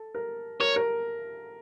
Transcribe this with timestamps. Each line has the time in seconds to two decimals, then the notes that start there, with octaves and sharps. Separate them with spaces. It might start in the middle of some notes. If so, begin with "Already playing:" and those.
Already playing: A4
0.15 A#4
0.60 A#4 C#5
0.76 A#4